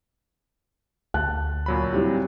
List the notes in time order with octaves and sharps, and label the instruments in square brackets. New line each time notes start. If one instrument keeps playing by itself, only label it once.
[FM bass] D2 [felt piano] A5 F#6
[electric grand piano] A#2 F#3 B5
[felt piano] G3 C4 E4